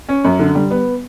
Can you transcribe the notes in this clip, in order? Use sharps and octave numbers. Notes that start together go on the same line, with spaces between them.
C#4
F#2
D3
G3
B3